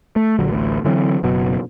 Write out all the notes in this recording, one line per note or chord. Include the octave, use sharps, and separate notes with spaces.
A3
A#1 D3 F#3
A1 D2
D3 E3 F#3 C4
F#1 B2 F#3